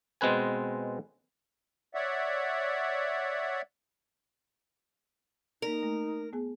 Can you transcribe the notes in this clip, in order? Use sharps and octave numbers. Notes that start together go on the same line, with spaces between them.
B2 G#3 C4 B4 G#5
C#5 D5 E5 F#5
A#3 D#4 A#4 D5
A3
B3 G#4 G#5